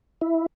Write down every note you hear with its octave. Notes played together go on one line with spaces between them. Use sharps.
E4